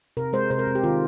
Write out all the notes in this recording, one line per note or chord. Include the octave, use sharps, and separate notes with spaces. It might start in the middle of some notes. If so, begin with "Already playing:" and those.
C3 A#4
G#3 C5
C3 C5
A#4
C3
G4
D#3 F4